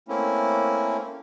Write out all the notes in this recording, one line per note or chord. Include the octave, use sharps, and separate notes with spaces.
A3 A#3 C4 C#4 E4